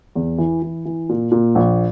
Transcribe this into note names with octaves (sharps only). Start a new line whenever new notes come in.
E2
E3
E3
E3
A#2
A#2
A#1